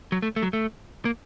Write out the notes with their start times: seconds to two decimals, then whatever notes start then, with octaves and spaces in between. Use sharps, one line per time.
0.12 F#3
0.22 A3
0.36 A3
0.42 F#3
0.53 A3
1.05 A#3